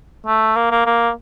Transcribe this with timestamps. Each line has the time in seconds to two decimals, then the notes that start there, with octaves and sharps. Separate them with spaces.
0.26 A3
0.56 A#3
0.71 A#3
0.86 A#3